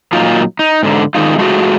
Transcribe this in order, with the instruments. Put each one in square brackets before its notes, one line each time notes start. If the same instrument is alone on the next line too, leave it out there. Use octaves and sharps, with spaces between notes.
[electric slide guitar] A#2 F#3 D#4 F4
D#4
G#2 D3
D#3 G#3 D#4 F4
G#3 A3 F4 F#4 G#4